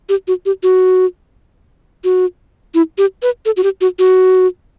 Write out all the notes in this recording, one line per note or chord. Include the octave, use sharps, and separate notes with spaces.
G4
F#4
G4
F#4
F#4
E4
G4
B4
A4
F#4
G4
F#4
F#4